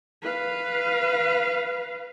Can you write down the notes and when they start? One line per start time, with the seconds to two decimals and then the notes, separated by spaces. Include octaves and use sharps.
0.23 B4 F5